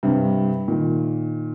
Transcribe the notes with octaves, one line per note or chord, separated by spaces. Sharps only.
G2 C3
A#2 D#3